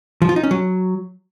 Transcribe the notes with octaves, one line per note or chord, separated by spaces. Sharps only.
F3
F4
D#4
C#4
F#3